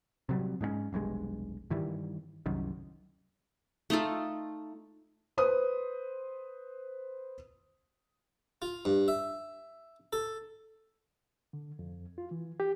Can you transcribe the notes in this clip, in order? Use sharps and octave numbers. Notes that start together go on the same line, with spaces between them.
C3 F#3 G3
G#2 G#3 A3 C#4
F1 B1 G2 G#3
G2 D#3 E3 G3
C2 F#2 D#3
A3 D#4 F4 A4
B4 C5 D#6
F4
G2
E5
A4
D3
F2
F4
E3
G4